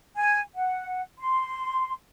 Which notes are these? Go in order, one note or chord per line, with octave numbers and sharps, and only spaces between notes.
G#5
F#5
C6